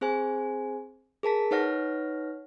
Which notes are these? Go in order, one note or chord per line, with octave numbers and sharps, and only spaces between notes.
C4 G#4 C5 G#5
G#4 A#4 A5 B6
D#4 B4 C#5 F#5 F6 A#6